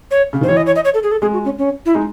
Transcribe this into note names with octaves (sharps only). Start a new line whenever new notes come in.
C#5
C#3
D#3 C5
E3 C#5
D#5
C#5
D#5
C#5
A4
G#4
A4
G#3 G#4
F#4
C#4
C#4
E4
G#3 D#4